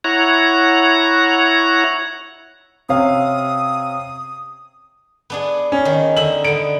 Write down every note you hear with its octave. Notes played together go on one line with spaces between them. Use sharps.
E4 C#5 F#5 A#5
C3 C#4 F5 D#6
B3 D4 G#4
C#4
D#3
D3 D#4 E5 F#7
D3 B3 D7